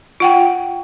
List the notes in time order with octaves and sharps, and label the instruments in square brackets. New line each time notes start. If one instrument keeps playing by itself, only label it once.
[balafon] F4 F#5 G5